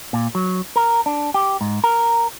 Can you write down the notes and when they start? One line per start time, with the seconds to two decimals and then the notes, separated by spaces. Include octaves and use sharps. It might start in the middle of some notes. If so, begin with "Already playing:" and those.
0.13 A#2
0.35 F#3
0.76 A#4
1.06 D4
1.34 G4
1.61 G#2
1.84 A#4